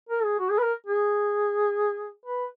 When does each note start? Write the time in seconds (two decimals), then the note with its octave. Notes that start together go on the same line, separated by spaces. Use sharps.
0.09 A#4
0.24 G#4
0.39 F#4
0.51 G#4
0.58 B4
0.63 A#4
0.86 G#4
2.26 B4